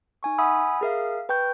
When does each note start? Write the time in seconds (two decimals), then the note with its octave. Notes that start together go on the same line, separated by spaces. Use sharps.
0.23 D#4 G#5 C#6
0.38 E5 F#5 G#5 B5 D#6 E6
0.81 G#4 A#4 E5 F5
1.29 B4 G5 C#6 G6